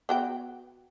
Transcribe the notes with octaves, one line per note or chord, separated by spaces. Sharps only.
B3 F#4 G5